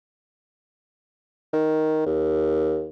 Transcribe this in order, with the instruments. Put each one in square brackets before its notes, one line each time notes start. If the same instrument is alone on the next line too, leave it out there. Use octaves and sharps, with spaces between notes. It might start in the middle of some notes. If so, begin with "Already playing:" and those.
[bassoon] D#3
D#2